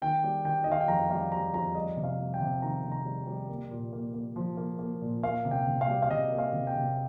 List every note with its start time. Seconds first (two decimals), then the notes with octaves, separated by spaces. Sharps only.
0.02 D#3 G5
0.24 G3
0.44 D#3 G5
0.64 D#3 D#5
0.72 F5
0.81 G5
0.88 F2 A#5
1.10 G3 F5
1.32 G3 A#5
1.54 F2 A#5
1.75 G3 D#5
1.97 C3
2.04 F5
2.19 G3
2.34 G5
2.40 C3
2.62 D#3 A#5
2.83 C3
2.92 A#5
3.05 G3
3.27 G3
3.49 A#3
3.71 A#2
3.93 A#3
4.14 A#3
4.36 F3
4.57 A#3
4.79 A#3
5.01 A#2
5.23 A#3 F5
5.45 C3
5.51 G5
5.67 C3
5.81 F5
5.88 G3
6.02 F5
6.10 C3 D#5
6.32 A#3
6.39 F5
6.53 C3
6.67 G5
6.75 C3